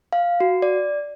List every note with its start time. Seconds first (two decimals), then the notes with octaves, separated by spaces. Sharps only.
0.13 F5
0.40 F#4
0.62 D5